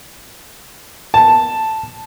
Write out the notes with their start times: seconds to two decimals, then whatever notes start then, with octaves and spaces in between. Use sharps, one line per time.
1.14 A5